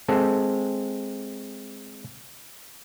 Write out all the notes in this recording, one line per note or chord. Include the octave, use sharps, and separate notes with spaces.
G#3 C4 A4